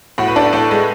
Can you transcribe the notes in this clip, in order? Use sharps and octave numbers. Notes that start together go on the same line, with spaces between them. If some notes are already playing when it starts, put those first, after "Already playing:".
A2 F#4
B4
D4 A4
A2 A4
G#3 B4